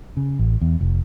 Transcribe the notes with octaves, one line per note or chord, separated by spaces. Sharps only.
C#3
A1
E2
F1